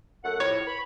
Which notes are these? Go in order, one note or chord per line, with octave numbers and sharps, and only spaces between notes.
F#2 A3 F#5
F2 A2 C#5
B5